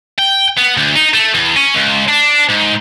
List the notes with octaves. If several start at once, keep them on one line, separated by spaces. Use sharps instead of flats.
G5
B3
D2
D#4
A3
E2
C#4
C#2
D4
G#2